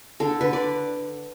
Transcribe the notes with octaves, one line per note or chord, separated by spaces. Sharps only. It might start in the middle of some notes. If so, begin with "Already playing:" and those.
D3 A4
D3 B4
D5